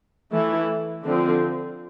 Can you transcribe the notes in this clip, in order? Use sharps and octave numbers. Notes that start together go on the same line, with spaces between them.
E3 A3 E4
D3 F3 C4